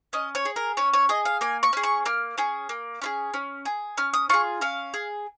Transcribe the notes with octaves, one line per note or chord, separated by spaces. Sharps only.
C#4 D#5
C#5
G#4
A#4
C#4 C#5
C#5
G#4 D#5
F5
A#3 G#5
C#6
C#4 G#4
C#6
A#3 F6
C#4 G#4
A#3
C#4 F4 G#4
C#4
G#4
C#4 F6
D#6
F4 G#4 C#6
C#4 F5
G#4